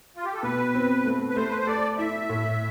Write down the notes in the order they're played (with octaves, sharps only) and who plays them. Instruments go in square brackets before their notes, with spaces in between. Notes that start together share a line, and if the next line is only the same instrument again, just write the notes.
[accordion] F4
G4
A4
[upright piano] B2 [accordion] B4
[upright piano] C4
A3
[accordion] B4
[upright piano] A3 [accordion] C5
[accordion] B4
C5
[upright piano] A4 [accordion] D5
[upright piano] E4 [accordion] E5
[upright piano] A2